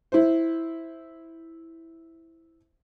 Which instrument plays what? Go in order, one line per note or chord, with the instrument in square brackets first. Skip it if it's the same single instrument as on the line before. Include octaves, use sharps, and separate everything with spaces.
[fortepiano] E4 C5